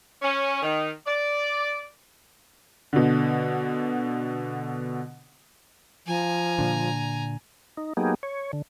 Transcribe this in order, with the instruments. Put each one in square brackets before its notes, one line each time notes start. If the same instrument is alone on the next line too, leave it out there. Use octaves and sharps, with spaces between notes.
[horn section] C#4
D#3
D5
[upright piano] B2 D3
[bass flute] F3 [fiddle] G#5 A#5
[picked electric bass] A#2 D3
[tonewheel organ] D#4
F#3 A#3 B3 D#4 G4 G#4
C#5
D3